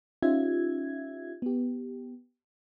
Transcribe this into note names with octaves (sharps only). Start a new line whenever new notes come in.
C#4 D#4 F4 G4 E5 G#6
B3 G4